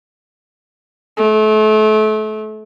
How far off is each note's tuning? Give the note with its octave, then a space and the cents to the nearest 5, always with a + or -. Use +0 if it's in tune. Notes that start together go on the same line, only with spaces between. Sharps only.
A3 -35